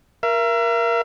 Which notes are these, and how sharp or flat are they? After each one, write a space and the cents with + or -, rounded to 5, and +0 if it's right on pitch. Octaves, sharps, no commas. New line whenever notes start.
A#4 +15 E5 +40